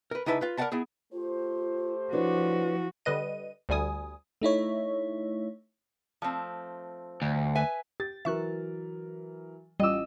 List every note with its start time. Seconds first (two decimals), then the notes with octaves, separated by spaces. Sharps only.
0.11 A#4 B4
0.26 C#2 D#4 E4 B4 A5
0.41 F4 B4
0.57 A#4 D5 F5 F#5 A5 B5
0.72 B3 E4 G#4
1.12 A3 F4 G4 C5
2.13 F3 D4 E4 F#4 B4 C#5
3.05 D3 G3 B4 D#5 D#7
3.69 D2 D3 G3 G#5 D#6
4.42 A3 D#4 E4 C#5
6.22 F3 A3 C4
7.22 D2
7.55 B4 E5 G#5
8.00 G4 A6
8.25 E3 F#3 A#4 E5 C#6 F#6
9.80 A1 G3 F4 D#5 D6 E6